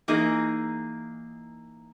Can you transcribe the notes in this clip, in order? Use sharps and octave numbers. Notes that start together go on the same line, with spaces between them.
E3 A#3 D#4 G#4